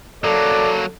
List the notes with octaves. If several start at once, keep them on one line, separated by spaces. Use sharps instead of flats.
F#3 A#3 A4 D5